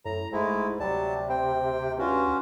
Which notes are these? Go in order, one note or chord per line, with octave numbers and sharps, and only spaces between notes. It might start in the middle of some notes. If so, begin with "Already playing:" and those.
F#2 A2 A#5
D1 G#2 G#3 A3 E4
D2 C3 F#3 G3 A5
C4 G5
G2 C#4 F4 F#4